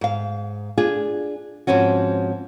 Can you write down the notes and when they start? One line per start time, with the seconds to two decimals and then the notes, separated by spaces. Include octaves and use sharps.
0.01 G#2 F5
0.78 D4 F4 G#4
1.67 G#2 F3 C4 C#4 F#4